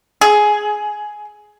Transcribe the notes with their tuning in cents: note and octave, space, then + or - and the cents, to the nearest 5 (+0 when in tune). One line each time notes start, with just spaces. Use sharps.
G#4 +10